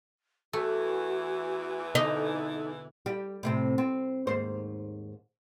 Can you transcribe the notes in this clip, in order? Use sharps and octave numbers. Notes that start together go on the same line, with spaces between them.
E2 E3 A3 F#4
B2 D3 D#4 A4
G3 G4
A2 C3 C4
C4
D#2 G#2 C5